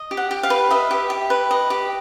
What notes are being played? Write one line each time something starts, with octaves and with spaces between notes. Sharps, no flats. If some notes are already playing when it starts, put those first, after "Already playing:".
Already playing: D#5
G4
F#5
G4
F5
B4
D#5 E5
G4
G4
B4
D#5
G4